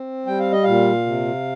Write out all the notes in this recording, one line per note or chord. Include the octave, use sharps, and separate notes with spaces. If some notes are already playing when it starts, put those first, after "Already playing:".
Already playing: C4
G3 G5
F5
D#5
A#2 F5
C3